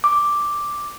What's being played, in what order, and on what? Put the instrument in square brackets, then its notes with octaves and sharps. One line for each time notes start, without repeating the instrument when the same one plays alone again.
[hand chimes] D6